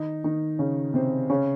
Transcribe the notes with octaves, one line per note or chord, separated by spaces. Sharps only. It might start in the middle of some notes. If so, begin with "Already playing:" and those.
Already playing: D#3 D#4
D#3 D#4
C#3 C#4
C3 C4
C#3 C#4